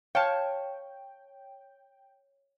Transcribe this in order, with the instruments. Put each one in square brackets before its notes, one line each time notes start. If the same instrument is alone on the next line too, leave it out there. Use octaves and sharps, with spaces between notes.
[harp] C#5 A5 [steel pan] F5 [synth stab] G5